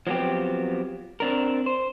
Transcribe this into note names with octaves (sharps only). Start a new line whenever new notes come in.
F3 F#3 B3 C4 G4
C4 D4 A#4
C5